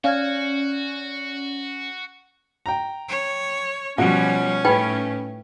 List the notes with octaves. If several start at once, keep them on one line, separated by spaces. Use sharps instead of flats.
C#4 F#4 D5 F5 F6 G#6
G5 A#5
C#5
B2 F3 G3 C#4 F4 F#4
A2 D#4 B4 G5 B5